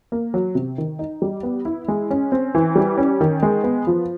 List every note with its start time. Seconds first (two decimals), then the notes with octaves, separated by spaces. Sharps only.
0.12 A#3
0.34 F#3
0.55 C3
0.78 D#3
0.99 D#4
1.22 G3
1.43 B3
1.65 E4
1.88 G#3
2.11 C#4
2.32 C4
2.55 E3
2.76 G3
2.98 C#4
3.21 D#3
3.43 G#3
3.64 B3
3.87 F3